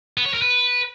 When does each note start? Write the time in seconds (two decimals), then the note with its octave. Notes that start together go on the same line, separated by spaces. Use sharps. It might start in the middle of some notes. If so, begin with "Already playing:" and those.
0.17 B3
0.26 C#5
0.34 A#4
0.42 B4